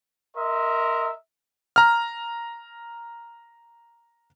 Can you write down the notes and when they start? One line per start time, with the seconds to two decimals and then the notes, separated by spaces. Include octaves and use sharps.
0.36 A#4 D#5 E5 C6
1.76 A#5 F6